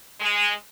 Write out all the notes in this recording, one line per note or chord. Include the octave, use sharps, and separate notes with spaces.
G#3